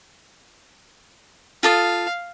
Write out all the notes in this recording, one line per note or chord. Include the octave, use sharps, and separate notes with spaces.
F4 A4 F5 D#6